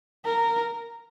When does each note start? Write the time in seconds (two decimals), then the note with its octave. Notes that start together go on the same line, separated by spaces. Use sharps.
0.25 A#4